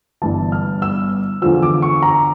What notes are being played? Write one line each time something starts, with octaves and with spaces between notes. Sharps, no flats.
G1 G2 E3 A5
F6
E6
E2 D3 F3 E6
D6
C#6
A#5